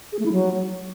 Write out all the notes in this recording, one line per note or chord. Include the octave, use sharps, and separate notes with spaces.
G#4
A3
E4
F#3